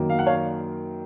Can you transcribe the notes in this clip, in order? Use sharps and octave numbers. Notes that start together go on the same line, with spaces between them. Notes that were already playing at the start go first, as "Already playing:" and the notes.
Already playing: F#2 D#3 F#3 A#3
F5
F#5
C#5 F5